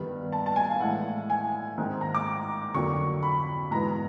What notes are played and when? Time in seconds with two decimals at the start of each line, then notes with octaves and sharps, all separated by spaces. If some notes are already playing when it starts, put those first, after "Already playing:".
Already playing: G2 D#3 G3 B3
0.32 A5
0.46 A5
0.56 G#5
0.69 F5
0.80 A2 E3 G#3 F#5
1.30 G#5
1.77 G#2 D#3 G#3 C4
2.01 A#5
2.15 D6
2.74 F2 D3 F#3 A#3 C#6
3.23 B5
3.71 G#2 E3 G#3 B3 A#5